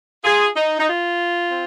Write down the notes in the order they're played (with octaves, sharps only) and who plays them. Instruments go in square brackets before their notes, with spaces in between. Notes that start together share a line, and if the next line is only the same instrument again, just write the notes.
[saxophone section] F4 G#4
D#4
D#4
F4
C4